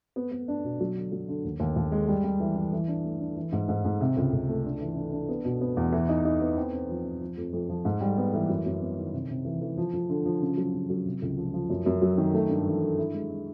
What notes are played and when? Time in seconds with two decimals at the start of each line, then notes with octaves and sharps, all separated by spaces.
0.16 B3
0.32 B3
0.48 D4
0.64 B2
0.80 F#3
0.96 D3
1.12 F#3
1.28 D3
1.44 D#2
1.60 D#2
1.76 D#2
1.92 G#3
2.08 G3
2.24 G3
2.40 E3
2.56 E3
2.73 E3
2.88 D4
3.04 A3
3.20 D4
3.36 E3
3.52 G#2
3.68 G#2
3.84 G#2
4.01 C3
4.17 C#2
4.32 C#2
4.49 A3
4.65 D4
4.80 E3
4.96 D4
5.13 D4
5.29 B3
5.45 B2
5.61 B3
5.77 E2
5.92 E3
6.09 D#4
6.25 D#4
6.41 B3
6.57 C4
6.73 C4
6.89 F3
7.05 C4
7.21 F3
7.37 F2
7.53 F2
7.69 F3
7.85 G#2
8.01 G3
8.17 B3
8.33 E3
8.49 F#2
8.66 F#2
8.81 B3
8.98 D#3
9.13 C3
9.30 C3
9.45 E3
9.62 E3
9.77 F3
9.93 F3
10.10 D3
10.26 F3
10.41 C#3
10.57 F#3
10.74 C#3
10.90 F#3
11.06 C3
11.22 C#2
11.38 F3
11.54 F3
11.70 F#2
11.86 F#2
12.02 F#3
12.18 D#3
12.34 A3
12.49 G2
12.66 E3
12.82 G2
12.98 E4
13.14 G#3
13.30 G#3